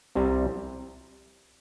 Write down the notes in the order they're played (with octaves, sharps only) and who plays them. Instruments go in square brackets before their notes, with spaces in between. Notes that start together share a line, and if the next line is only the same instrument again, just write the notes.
[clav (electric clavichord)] C2 C3 G3